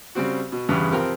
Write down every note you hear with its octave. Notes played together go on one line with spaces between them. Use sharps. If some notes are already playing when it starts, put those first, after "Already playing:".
C#3 G3 C4 F#4
B2
E2 G2 C#3 E3
C3 F3 C4 A#4 G5